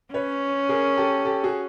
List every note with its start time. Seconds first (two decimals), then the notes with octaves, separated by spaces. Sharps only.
0.14 C#4 B4 C#5
0.69 G#4 A#4
0.97 G4 A4
1.25 G4 A4
1.44 F#4 G#4